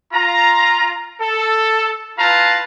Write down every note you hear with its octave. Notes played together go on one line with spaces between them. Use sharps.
F4 A#5
A4
E4 F4 B4 F5 A5 A#5